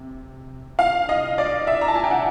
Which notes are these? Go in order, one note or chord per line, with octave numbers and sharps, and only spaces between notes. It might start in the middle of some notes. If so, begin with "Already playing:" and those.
Already playing: C3
F5
D#5
D5
E5
A#5
A5
G#5
G5
F#5